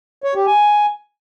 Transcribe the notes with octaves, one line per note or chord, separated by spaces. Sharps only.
C#5
G4
G#5